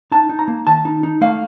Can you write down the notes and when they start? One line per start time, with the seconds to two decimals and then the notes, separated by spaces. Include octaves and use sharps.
0.12 D#4 A5
0.29 D#4
0.39 A#5
0.48 A#3
0.67 D#3 A5
0.85 D#4
1.03 D#4
1.21 A3 F5